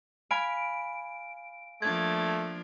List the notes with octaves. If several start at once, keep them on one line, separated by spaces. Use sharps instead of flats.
F5 G#5 B5 D7
F3 A3 A#3 D4 G#6